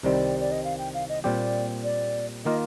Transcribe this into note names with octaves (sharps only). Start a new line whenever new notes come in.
C2 C3 D#3 G3 C4 D5
D5
D#5
F5
G5
F5
D#5
A#2 G3 C4 G4 D5
D5
D#3 A#3 F4 D#5